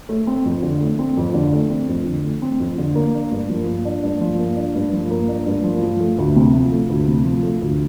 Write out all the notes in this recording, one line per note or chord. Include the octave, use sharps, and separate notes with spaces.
A3
C4
F2
D3
A3
C4
F2
D3
A3
C4
F2
D3
A3
C4
F2
D3
A#3
D4
G2
F3
A#3
D4
G2
F3
A#3
D4
G2
F3
A#3
D4
G2
F3
F3
A3
D2
C3
F3
A3
D2
C3
F3
A3
D2